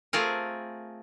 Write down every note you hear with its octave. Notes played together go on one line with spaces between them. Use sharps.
A3 C4 F4 G#4 A#4